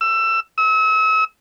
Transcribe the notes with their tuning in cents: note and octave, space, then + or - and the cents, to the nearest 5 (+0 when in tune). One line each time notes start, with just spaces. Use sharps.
E6 +20
E6 -40